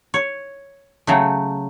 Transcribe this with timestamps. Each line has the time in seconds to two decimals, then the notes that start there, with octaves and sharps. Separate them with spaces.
0.14 C#5
1.07 C#3 F#3 A3